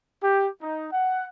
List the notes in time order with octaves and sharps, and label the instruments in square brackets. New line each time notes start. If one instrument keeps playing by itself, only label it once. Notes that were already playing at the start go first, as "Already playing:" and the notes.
[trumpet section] G4
D#4
F#5